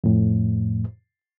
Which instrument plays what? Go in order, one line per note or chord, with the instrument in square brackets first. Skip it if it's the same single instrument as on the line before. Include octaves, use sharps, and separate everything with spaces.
[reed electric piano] F2 A2